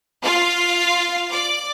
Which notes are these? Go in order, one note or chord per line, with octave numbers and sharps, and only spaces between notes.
F4 F5
D5 D6